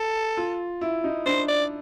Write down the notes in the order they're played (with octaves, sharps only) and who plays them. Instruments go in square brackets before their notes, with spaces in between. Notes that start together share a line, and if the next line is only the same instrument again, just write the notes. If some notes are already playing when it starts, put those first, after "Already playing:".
Already playing: [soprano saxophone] A4
[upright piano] F4
E4
D#4
[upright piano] D4 [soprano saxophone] C5
[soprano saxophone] D5